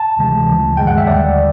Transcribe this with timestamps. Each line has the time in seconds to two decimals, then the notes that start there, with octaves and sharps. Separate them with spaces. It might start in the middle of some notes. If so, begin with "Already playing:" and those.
Already playing: A5
0.17 D2 C3 E3 G#3
0.48 D2 C#3 F3 A3
0.77 G2 D#3 G#3 G5
0.87 F#5
0.98 E5
1.07 D#2 D3 G3 D5